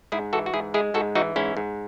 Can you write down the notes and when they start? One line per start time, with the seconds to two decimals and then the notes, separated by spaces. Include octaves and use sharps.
0.12 G#2 E4 G#4
0.33 E3 F#4 A4
0.46 F#4
0.54 G#2 E4 G#4
0.74 G#3 E4 G#4
0.94 G#2 F#4 A4
1.15 E3 D#4 F#4
1.36 G#2 C#4 E4
1.57 G#2